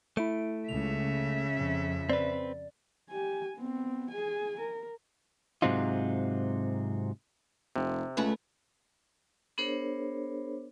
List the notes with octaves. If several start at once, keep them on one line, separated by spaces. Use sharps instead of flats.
A3 E4 E5 D7
C#2 C#3 E5 F7
F2
C4 B4 D5
G4 G#5
B3 C4
G#4 G#5
A#4
G#2 C3 F#3 C4 D#4 F4
F1 C3
C#2 A3 C#4 B4
B3 D4 G#4 A#4 C5 C#5